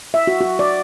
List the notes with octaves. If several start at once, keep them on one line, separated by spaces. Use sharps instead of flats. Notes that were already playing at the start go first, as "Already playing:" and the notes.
E5
F#4
F#4
D5